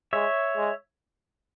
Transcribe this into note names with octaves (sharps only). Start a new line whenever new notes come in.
G#3 C#5 E5
G#3